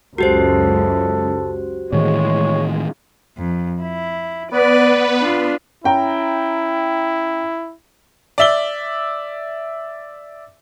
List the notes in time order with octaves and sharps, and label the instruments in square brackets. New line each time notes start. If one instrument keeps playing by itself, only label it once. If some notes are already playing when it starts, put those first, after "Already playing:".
[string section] C#2 F#2 [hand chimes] F#4 G4 C5 [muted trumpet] A4
[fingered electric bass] A2 D#3 E3 [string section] G#3 [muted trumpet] C#5
[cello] F2
E4
[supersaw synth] B3 B4 [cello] D5
[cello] D4 F4
[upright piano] C#4 G5 A#5 [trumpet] E4
[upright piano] D5 E5 G7